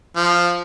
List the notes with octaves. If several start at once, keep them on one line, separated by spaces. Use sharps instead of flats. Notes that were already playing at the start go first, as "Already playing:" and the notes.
F3